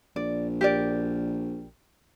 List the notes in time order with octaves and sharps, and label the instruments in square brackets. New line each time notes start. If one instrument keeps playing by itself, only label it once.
[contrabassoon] A#1 [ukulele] D5
[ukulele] G4 A#4 D5